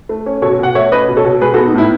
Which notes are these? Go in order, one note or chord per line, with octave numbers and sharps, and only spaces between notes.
A3
C#4
B2 A4 C#5
B2 F#5
A3 C#5 E5
C#4 B4 D#5
B2
A4 C#5
B2
G#3 G#4 B4
F#4 A4
B3
D#4
A2 E4